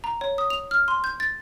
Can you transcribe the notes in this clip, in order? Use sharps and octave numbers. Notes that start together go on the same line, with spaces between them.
A#5
C#5
D#6
F7
F6
C6
G6
A6